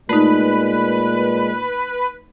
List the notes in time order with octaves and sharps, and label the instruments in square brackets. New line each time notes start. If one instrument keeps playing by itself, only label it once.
[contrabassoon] A#2 [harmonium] G#3 [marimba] A3 D#4 [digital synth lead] B4